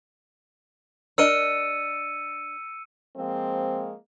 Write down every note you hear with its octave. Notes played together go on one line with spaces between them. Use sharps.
D4 A#4 D#5 E6 C#7 D#7
F3 G#3 A#3 C4